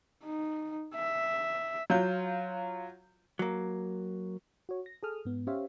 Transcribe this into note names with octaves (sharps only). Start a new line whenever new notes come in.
D#4
E5
F#3 F4 G6
F#3 A#3
F#4 C#5
A#6
G#4 A4 D#6 F6
G#2 B3
C#4 G4 C5 C#5 E5 F5